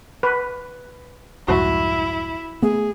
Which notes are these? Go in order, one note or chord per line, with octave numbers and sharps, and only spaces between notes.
B4
C2 F2 G#2 E4 F#4
A3 B3 G#4